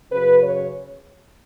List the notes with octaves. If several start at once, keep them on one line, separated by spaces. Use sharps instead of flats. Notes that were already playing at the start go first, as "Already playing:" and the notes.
F#2 C#3 B4
C#5